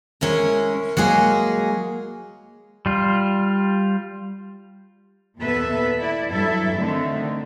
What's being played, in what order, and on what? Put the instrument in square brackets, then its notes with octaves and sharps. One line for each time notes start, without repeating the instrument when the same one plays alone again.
[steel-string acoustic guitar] G#3 C#4 E4 A#4
F#3 G#3 A#3 G#4
[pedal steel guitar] G3 F4
[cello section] D#2 A#2 B3 A4 B4 E5
E4 D5
G2 F#3 E4 A4 E5
D3 D#3 A3 C4